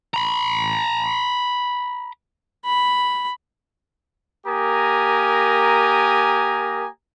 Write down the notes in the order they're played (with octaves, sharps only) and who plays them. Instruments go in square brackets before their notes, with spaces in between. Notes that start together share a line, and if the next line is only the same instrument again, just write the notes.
[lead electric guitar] A#5 B5
[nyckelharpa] B5
[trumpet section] A#3 G4 A#4 G#5 A#5 D#6